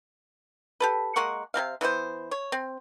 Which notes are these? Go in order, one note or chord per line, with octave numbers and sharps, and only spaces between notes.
G4 A4 B4
G#3 A#3 F#5 C#6
C3 G3 C4 F5
E3 B3 D4 C5
C#5
C4